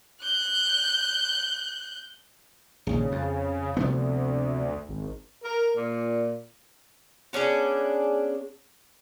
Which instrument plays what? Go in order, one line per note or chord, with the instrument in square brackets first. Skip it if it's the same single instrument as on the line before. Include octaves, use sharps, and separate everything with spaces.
[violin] F#6 G6
[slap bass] A#1 D#2 [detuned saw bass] C#3
[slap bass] F2
[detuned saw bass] D2 [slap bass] C3 F3 B3
[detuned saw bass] G#1
[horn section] A#4
A#2
[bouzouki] B3 C#4 D4 G#4